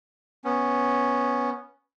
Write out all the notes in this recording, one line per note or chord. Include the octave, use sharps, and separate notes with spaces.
B3 C#4